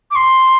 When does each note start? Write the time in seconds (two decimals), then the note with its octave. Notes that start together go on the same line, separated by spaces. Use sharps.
0.11 D6
0.15 C6